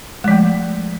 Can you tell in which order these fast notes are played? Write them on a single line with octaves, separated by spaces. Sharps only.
G#3 F3 A3